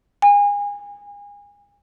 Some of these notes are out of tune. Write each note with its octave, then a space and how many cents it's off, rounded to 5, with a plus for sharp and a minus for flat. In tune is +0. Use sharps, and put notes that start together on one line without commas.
G#5 -30